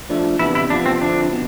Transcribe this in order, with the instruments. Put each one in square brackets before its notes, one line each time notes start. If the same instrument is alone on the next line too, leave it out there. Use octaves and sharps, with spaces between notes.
[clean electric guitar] F3 A3 D4
[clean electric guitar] C3 E3 B3 D4 [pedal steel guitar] E4
[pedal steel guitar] E4
[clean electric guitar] C3 F3 B3 [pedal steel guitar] D4
[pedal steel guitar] C4
[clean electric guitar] D3 F3 C4 E4 [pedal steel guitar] D4
[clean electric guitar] B2